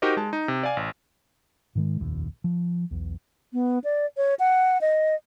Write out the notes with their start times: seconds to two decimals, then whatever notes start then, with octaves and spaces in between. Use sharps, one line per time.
0.02 D#4 F#4 G4 A#4 C5 D#5
0.17 G#3 A5
0.33 D#4
0.48 C3
0.63 D5 F5 G#5
0.77 A1
1.75 G#2 D#3 G#3
2.00 F1 A#1 D#2
2.44 F3
2.91 B1 E2
3.53 B3
3.84 D5
4.17 C#5
4.39 F#5
4.81 D#5